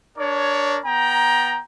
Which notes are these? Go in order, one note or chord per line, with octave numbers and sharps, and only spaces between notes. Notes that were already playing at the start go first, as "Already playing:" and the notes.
D4 A#4 C#5
B3 G5 A#5